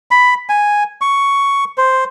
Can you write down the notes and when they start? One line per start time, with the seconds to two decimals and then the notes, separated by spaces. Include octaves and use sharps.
0.11 B5
0.49 G#5
1.01 C#6
1.78 C5